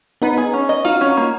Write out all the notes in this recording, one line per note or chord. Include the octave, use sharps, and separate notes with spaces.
B3 D#4 B4
G#4
C#4
D#5
D#4 F4 F#4
C#4
A#3